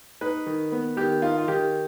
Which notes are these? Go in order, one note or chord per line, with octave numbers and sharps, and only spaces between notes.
D#4 B4
D#3
B3
D#3 G4
D#4 F4
F4
D#3 G4